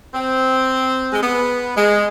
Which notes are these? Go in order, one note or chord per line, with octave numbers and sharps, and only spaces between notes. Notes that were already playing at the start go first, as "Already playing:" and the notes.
C4
G#3
B3
G#3